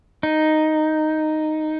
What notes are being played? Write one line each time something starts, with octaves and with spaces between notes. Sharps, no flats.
D#4